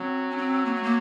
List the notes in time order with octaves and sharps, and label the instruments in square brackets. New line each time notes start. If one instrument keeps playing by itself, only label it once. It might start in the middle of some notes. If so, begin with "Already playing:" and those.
Already playing: [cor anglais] F#3 [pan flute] C4
[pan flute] C#4
C4
A#3
A3
A#3